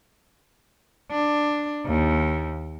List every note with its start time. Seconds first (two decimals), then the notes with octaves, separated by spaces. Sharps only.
1.11 D4
1.86 D#2